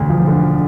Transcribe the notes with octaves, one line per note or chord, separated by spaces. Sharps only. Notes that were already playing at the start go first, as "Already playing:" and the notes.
Already playing: E1 D2
F3
D3